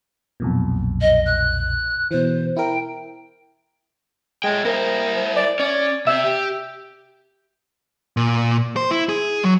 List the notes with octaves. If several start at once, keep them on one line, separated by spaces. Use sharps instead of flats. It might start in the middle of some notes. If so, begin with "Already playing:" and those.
B1 F2 A#2
D#5
F#6
B2 E3 C5
E4 A#4 G5
G#3 A3 G5
A#3 E4 C5
D5
C#4 D5
C3 C4 E5
G4
A#2
C5
E4
G#4
F#3